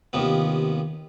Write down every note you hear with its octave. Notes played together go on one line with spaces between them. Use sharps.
D#2 C3 F3 B3